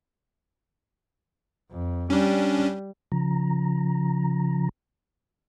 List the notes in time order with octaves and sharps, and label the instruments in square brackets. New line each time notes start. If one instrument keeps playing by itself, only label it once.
[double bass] F2
[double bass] G3 [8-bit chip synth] C#4 D4
[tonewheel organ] C#3 F3 A#5